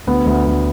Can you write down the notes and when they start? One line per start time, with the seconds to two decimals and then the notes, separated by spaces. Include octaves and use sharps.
0.07 D2 B3
0.26 D2
0.45 D2